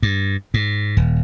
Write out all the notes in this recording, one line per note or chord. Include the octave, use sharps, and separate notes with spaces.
G2
G#2
D#1